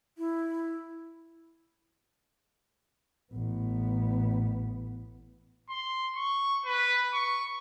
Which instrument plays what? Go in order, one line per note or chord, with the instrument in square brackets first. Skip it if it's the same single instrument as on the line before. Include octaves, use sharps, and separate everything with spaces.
[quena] E4
[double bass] A1 B3
[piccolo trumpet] C6
C#6
B4
C#6